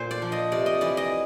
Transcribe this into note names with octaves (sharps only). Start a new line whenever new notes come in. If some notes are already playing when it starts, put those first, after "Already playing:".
Already playing: A#2 C5
D5
F3
D#5
C3 D5
D#5
E3 D5
D#5